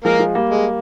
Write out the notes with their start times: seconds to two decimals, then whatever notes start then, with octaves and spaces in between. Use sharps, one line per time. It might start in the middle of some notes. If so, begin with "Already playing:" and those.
0.04 F3 G#3 A#3 A#4
0.19 F3 G#3
0.35 G3 A#3
0.50 G#3